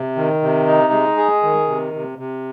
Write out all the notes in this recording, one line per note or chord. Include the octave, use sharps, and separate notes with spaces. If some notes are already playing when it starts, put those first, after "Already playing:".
Already playing: C3
D#3
C3
D#4
G#3
G#4
D#3
C3
C3
C3